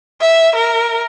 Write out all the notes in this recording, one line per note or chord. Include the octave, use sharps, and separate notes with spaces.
E5
A#4